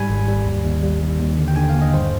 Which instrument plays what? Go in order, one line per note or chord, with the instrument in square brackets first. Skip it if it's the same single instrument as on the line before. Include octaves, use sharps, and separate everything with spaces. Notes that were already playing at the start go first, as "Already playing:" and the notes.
Already playing: [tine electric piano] G#2 G3 G#5 B5
G#1
G3
D#2
D#2
G3
D#2
D#2
D3
G5
D3 G#5
F5
D#2
D#5
G2 C5